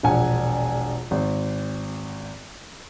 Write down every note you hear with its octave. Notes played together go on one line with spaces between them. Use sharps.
E1 A#1 F#5 G#5
G#1